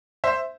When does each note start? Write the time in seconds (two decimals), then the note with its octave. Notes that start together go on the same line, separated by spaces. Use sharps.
0.24 C5 E5